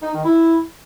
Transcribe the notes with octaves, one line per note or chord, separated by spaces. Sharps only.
D#4
D#3
E4